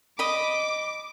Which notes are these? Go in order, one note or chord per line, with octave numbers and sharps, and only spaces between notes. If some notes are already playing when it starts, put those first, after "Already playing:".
D#5 B5 D6